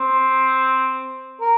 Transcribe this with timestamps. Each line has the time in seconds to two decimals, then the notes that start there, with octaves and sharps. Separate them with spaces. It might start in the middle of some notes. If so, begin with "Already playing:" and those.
Already playing: C4
1.41 A#4